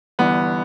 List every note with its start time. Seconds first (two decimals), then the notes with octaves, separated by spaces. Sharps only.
0.19 G1 G2 E3 B3